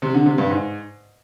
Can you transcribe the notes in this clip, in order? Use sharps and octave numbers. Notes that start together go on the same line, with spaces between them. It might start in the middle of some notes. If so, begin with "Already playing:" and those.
C3
D3
C3
G2
G#2